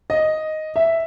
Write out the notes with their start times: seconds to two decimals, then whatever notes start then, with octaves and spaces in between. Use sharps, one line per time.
0.10 D#5
0.76 E5